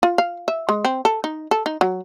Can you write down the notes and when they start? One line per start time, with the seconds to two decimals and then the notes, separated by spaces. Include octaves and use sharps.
0.03 F4
0.18 F5
0.48 E5
0.69 G#3
0.85 C4
1.05 A4
1.24 D#4
1.51 A4
1.66 D#4
1.81 F#3